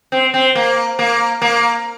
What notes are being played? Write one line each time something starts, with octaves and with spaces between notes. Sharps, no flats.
C4
C4
A#3
A#3
A#3